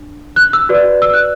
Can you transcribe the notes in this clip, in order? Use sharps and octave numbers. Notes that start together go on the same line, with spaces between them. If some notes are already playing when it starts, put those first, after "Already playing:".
Already playing: D4
F#6
E6
F#4 B4 D5
E6
F#6